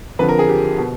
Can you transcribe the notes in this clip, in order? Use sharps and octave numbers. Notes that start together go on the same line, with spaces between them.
F2 D3 F3 B4
A#4
G#4
G4
B2